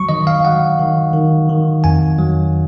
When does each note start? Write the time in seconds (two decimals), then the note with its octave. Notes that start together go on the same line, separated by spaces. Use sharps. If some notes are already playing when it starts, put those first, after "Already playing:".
Already playing: F#3 C#6
0.09 D#3 D#5
0.27 F5
0.45 F#3 F#5
0.79 D#3
1.14 D#3
1.49 D#3
1.84 F2 G#5
2.19 F#3